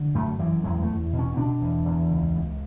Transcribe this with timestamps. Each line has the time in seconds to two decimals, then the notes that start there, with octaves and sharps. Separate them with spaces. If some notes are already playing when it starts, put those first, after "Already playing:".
Already playing: D3
0.15 F#2 A3
0.39 F#2 E3
0.64 E2 G#3
0.82 A3
0.89 E2
1.13 B2
1.19 C#4
1.37 B2 D4
1.61 E2
1.86 E2
2.10 C#2
2.35 C#2